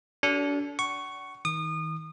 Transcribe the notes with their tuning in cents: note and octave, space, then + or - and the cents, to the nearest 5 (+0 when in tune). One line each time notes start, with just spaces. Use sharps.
D4 -35 F#4 +40 A4 +0
F#5 +35 C#6 +0
D#3 +35 D#6 -30